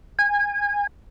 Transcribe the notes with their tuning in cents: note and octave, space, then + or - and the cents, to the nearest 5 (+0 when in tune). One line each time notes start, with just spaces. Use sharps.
G#5 -25